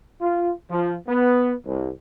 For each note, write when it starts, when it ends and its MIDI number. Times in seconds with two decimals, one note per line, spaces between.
0.21 0.52 65
0.70 0.94 53
1.08 1.54 59
1.66 1.90 36